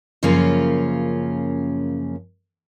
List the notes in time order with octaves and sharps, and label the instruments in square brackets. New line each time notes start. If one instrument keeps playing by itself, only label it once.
[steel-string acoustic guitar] F#2 C#3 F3 A#3 C#4 F4